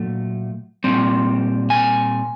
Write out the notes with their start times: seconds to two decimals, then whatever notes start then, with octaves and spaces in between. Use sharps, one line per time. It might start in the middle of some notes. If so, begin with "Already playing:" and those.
Already playing: A#2 F#3 A3
0.84 A#2 G3 C4
1.70 G#5